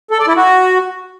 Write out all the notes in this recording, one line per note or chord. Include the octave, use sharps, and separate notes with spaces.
A4
D5
E4
F#4